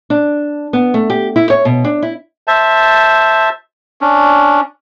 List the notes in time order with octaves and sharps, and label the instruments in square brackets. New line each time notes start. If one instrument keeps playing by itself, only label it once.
[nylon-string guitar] D4
B3
A3
G4
E4
C#5
B2
D4
E4
[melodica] C5 E5 A5
C#4 D4